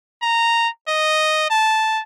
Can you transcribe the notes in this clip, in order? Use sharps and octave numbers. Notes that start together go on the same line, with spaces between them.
A#5
D#5
A5